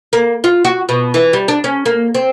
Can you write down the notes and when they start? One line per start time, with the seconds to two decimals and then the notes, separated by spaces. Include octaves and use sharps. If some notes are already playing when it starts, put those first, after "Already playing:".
0.13 A#3
0.44 F4
0.65 F#4
0.89 B2
1.14 E3
1.33 G3
1.48 D4
1.64 C#4
1.86 A#3
2.15 C4